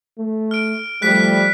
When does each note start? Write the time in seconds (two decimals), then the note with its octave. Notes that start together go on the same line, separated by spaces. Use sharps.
0.19 A3
0.51 F6 D7
1.02 F3 G3 A3 F#6 B6